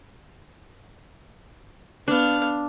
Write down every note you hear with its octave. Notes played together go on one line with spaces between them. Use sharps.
B3 D4 F5